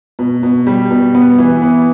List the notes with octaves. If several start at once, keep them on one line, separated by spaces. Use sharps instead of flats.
B2
B2
G3
B2
B3
E3
B3